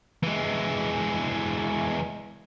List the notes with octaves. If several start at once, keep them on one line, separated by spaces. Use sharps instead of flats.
E3 G#3